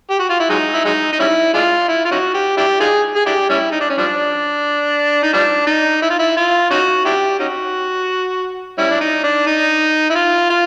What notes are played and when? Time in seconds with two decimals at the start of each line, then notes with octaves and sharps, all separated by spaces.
0.10 G4
0.19 F#4
0.29 F4
0.40 E4
0.50 F#3 G#3 D#4
0.74 E4
0.85 F#3 G#3 D#4
1.13 D#4
1.20 G3 C#4 E4
1.54 G#3 D4 F4
1.88 E4
2.05 F4
2.11 C#4 D#4 F#4
2.34 G4
2.57 D4 E4 G4
2.80 D#4 F4 G#4
3.16 G#4
3.26 D4 E4 G4
3.49 G3 C#4 E4
3.72 D#4
3.80 D4
3.90 C#4
3.98 F3 G3 D4
5.23 D#4
5.33 F3 G3 D4
5.67 D#4
6.02 E4
6.10 F4
6.19 E4
6.37 F4
6.71 C#4 D#4 F#4
7.05 D4 E4 G4
7.39 C#4 D#4 F#4
8.78 G3 C#4 E4
8.90 D4
9.01 D#4
9.24 D4
9.46 D#4
10.10 E4
10.15 F4
10.50 F4